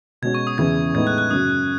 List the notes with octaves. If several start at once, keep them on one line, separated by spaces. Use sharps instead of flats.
B2 G#3 C#4 F#4 G#6
C#6
D#6
E2 C#3 E3 B3 E4 G#6
A2 G#3 B3 D#4 G#6
F#6
F#6
F#2 C#3 F#3 D#6